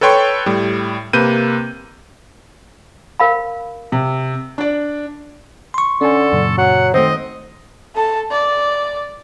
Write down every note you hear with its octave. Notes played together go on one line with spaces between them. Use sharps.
A4 B4 C#5 G5 C6 C#6
A2 G3
C3 A#3 B4 G6 D#7
A#4 F5 B5
C3
D4 D5
C6 C#6
D3 C#4 A4 G#5
F#2 A#2 C#3
F#3 F#5
D#3 A3 C4 C5 D#5
A4 A5
D5